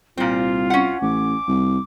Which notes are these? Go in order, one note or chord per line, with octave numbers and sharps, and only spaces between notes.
C2 A#2 C4 F4
C#4 F#5
A1 D6
C2